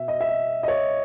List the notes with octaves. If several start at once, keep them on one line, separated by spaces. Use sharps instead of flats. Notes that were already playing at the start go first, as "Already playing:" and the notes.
Already playing: B2 E5
D#5
E5
D#5
D#5
C#5